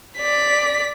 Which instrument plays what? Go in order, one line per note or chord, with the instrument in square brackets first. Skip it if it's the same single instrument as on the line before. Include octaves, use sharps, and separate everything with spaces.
[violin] D5 B6